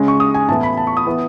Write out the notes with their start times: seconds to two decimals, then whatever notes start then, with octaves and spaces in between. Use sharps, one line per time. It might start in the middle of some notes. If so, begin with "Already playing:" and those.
Already playing: C#3 G#3 C#4
0.08 C#6
0.20 D#6
0.34 G#5
0.49 A2 E3 B3 A5
0.63 B5
0.77 A5
0.87 C#6
0.97 D#6
1.06 E3 B3